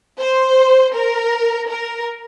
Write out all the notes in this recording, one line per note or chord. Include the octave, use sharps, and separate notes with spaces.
C5
A#4
A#4